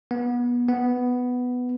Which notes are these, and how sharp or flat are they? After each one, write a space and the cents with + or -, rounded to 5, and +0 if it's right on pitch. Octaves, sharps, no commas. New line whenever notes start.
B3 -25
B3 +5